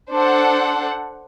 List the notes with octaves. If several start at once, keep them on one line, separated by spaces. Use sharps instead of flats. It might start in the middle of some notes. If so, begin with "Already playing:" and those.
D4 A4 C5 F#5